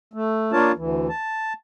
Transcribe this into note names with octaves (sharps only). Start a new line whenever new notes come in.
A3
A#3 D4 F4 A#4 C#5 A5
D2 E3
A5